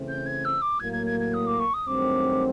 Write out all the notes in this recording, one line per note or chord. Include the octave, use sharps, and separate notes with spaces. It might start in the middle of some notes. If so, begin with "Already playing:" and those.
Already playing: C#3 E3 A3 C4
G6
G#6
E6
D6
A2 F#3 A#3 G#6
G#6
G#6
G#6
D#6
D6
C#6
D#6
G2 D#3 F#3 A3 C4 D6